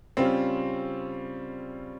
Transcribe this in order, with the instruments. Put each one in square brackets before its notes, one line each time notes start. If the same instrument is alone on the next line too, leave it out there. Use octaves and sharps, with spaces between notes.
[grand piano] C#3 G3 C#4 F4 [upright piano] C4